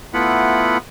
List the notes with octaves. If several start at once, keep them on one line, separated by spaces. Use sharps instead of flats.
A3 B3 E4 F4 F#5 B5